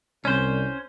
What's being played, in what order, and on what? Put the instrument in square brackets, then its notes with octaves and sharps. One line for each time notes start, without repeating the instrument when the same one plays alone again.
[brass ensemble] C2 [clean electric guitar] C#4 C5